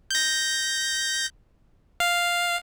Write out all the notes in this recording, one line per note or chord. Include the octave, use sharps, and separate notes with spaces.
G6 A#6
F5